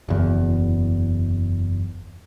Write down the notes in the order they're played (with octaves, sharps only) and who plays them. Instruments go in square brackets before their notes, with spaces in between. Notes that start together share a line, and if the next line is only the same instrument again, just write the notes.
[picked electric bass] F#1 E2